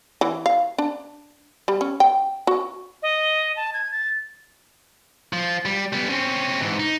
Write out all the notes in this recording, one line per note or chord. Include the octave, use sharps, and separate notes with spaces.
E3
F5
D4
G3
C#4
G5
F#4
D#5
A5
G#6
A6
F3
G3
G3 B3
C4 C#4
G#2 E3
D#4